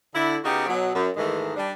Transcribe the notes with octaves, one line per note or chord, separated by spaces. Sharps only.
D3 E4
C#3 B3 D#4 F#4 G4
B2 F#3
F#2
G#2 D#3 E3 G#3 A3
G3 D4